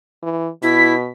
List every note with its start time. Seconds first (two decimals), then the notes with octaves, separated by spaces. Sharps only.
0.23 E3
0.63 B2 E4 B6